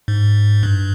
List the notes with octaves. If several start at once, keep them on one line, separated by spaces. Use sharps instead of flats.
G#2
G2